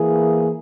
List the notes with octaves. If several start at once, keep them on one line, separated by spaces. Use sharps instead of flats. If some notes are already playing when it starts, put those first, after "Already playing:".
Already playing: E3 A#3 E4 G#4